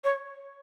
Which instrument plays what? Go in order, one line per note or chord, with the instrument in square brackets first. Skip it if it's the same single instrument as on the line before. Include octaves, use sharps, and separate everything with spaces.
[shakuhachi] C#5